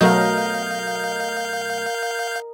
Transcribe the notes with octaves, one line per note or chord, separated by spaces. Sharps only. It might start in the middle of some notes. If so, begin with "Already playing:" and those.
B2 F#3 A3 A#4 D#5 F5 G6